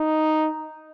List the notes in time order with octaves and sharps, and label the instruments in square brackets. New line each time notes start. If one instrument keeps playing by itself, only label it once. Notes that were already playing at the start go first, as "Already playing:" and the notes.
Already playing: [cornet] D#4